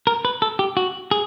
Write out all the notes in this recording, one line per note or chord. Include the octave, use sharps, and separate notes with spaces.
A#4
B4
A4
G4
F#4
G#4